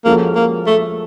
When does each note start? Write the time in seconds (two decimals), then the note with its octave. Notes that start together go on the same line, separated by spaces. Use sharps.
0.05 F3 G#3 A#3 C#4 F#4 A4
0.35 A#3
0.67 A3